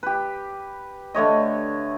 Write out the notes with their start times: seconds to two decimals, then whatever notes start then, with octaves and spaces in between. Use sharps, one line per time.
0.03 G4 B4
1.14 D3 A3 C#5 D#5